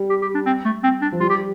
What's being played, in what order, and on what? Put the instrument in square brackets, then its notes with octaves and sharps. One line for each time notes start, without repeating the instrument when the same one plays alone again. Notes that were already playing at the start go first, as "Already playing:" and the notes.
Already playing: [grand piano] G3
[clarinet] G4
G4
D4
C4
A3
C4
D4
[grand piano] F3
[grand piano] G3 [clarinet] F4
[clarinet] G4